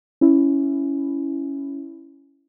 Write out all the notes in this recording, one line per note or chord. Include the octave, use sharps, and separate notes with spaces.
C#4 E4